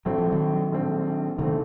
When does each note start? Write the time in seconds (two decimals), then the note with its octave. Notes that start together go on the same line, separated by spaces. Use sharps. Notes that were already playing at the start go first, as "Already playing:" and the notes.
0.05 A#1 A2 F#3 A3 C4
0.18 F3
0.32 D#3 F#3
0.72 A#1 A2 A3 C4
1.38 A#1 A2 C3 D#3 A3 C4